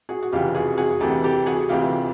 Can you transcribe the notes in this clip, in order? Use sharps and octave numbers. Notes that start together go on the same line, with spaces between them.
F#4 G#4
F#4
F1 F2 C#3 E3 F4 G4
F#4 G#4
F#4 G#4
D2 C3 E3 G4 A4
G4 A4
F#4 G#4
D2 C3 E3 F4 G4